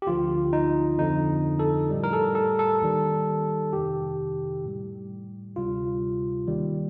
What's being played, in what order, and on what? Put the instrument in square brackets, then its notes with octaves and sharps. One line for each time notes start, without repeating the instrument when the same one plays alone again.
[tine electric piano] G4
D2 D3 F3 F4
D#4
F2 D3 F3 D#4
A4
A2 G3
A#4
A4
A4
A4
D#2 D#3 G3
F2 C3 D#3 G4
A2 G3
D2 C3 G3 F4
D#2 D#3 G3